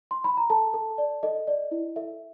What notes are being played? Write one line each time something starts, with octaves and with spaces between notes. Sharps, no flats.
C6
B5
A#5
A4 A5
A4
D5
A4 D#5
D5
E4
A4 E5